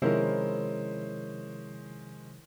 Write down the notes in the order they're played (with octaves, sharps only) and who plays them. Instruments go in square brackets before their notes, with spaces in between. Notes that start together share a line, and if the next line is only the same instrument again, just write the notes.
[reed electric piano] C3 D#3 F3 [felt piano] G#3 C#4 C5 [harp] E4 A#4